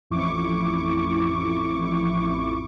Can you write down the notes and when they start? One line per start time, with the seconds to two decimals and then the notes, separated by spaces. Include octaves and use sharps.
0.10 A1 F2 E4 C#6 D6